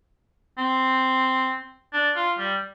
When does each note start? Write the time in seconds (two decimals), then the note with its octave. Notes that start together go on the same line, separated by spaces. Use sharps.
0.58 C4
1.93 D4
2.16 F4
2.38 G3